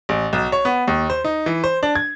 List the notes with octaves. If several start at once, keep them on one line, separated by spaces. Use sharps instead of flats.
A1
B1
C#5
B3
D#2
C5
D#4
E3
C5
D4
G#6